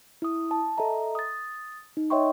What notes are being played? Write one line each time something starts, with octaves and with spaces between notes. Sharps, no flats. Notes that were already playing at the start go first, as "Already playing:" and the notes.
E4 D#6
A5
A4 D#5 E5 A#5
D#6 A6
D#4
C#5 D#5 E5 G5 C6 C#6